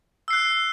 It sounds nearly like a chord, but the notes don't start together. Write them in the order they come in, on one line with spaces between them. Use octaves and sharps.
E6 C7 F#6